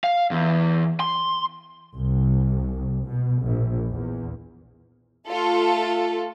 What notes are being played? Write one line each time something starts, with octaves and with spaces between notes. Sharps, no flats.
F5
E2
C6
C2
B2
A#1
E2
A3 F4 A4